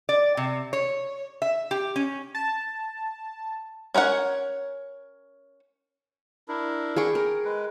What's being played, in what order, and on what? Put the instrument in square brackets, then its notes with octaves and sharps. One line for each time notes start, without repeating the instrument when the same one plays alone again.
[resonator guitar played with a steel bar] D5
C3
C#5
E5
G4
C#4
[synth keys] A5
[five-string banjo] C#4 A#4 C#5 F#5
[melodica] D4 E4 A#4
[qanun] G#4 G5 C#6
A#4
[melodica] G#3 B4